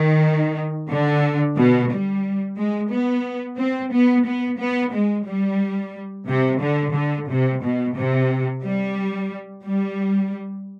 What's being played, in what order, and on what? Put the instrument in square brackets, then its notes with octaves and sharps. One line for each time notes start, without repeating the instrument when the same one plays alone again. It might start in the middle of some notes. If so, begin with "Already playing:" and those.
Already playing: [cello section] D#3
D3
B2
G3
G#3
B3
C4
B3
B3
B3
G#3
G3
C3
D3
D3
C3
B2
C3
G3
G3